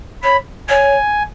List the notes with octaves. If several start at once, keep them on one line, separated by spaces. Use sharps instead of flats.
C#5 B5
C#5 G#5